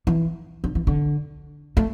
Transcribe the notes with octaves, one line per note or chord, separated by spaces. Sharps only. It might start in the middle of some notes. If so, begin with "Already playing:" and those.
E3
D3
E3
D3
A3